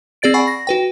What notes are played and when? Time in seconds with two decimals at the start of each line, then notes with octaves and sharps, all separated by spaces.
0.22 C4 G#4 D5 A6 D7
0.34 D5 F#5 G#5 B5 C#6 C7
0.47 A#6
0.67 F#4 B4 G5